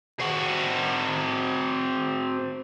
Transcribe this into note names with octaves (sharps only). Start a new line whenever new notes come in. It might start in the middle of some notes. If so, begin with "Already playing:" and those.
C4 F#4